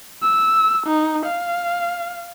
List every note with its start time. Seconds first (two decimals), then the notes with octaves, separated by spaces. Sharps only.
0.22 E6
0.87 D#4
1.26 F5